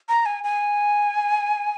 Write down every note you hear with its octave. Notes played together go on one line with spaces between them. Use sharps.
A#5
G#5
G#5